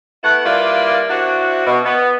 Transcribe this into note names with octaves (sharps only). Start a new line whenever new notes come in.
A3 B3 E4 F#5
G3 A#3 E4 F4 B4 D5
C4 D4 E4 F#4
B2
B3